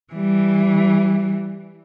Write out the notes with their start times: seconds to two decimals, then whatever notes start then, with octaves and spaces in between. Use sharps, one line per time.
0.14 E3 G3